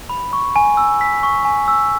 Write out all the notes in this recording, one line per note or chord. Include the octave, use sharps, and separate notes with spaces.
B5
C#6
G#5
E6
B6
C#6
G#5
E6